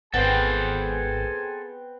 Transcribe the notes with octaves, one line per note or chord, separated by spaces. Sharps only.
G#1 B3 C4 G#4 A4 C5 G#5